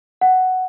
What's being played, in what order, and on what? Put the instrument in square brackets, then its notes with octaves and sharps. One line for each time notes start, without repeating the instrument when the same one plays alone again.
[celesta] F#5